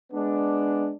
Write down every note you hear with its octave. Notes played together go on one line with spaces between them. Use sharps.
G#3 B3 D4